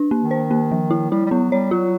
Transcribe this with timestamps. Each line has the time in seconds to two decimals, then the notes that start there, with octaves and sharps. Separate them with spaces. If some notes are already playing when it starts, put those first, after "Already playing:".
Already playing: D4
0.11 A#3
0.21 D#3
0.31 C5
0.51 A#3
0.71 F3
0.91 E4
1.11 G3 E4
1.26 G3
1.31 F#3 B3
1.52 G3 C#5
1.71 F#3 F4